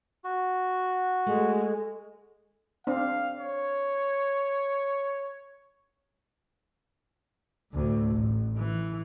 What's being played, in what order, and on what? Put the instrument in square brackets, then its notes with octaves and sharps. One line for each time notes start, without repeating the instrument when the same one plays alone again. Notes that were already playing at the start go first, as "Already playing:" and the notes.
[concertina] F#4
[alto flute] G#3 [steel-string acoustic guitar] A3
[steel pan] C4 D4 [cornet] F5
[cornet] C#5
[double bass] D2 A2
A1
E3